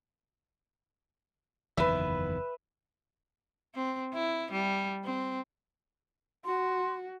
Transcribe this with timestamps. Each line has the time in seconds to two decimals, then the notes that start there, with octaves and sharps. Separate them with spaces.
1.77 F#1 E2 D#3 B4 E5
3.75 C4
4.13 E4
4.52 G3
5.05 C4
6.45 F#4 C6